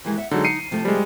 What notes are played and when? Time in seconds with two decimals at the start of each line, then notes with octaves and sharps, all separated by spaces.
0.05 D#2 E3 G#3
0.18 E5 F#5
0.31 D3 F#3 G#3 D#4
0.45 C7 C#7 D#7
0.71 C3 F3 A3
0.85 G3 G#3